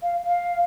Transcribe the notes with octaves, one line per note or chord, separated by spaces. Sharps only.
F5
F5